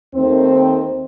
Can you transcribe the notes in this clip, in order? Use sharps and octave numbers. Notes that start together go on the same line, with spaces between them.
D#2 D#3 A3 C4